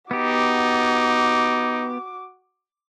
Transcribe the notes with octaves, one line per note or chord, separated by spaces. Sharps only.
B3 D#4 F#4 G4 D6